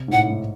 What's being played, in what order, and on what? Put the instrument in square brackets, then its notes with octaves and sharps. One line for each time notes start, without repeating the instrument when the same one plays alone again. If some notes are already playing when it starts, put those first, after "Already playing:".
Already playing: [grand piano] C3
G#2
[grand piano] A2 [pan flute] F#5
[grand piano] G#2